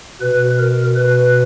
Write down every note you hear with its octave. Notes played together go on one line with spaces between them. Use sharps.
B2 B4
A#4
B4